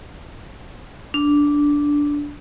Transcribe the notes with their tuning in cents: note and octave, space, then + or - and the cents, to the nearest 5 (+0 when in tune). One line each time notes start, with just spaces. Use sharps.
D4 -10